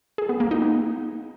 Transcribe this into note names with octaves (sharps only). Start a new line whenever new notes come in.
G#4
B3
A#3
D#4
B3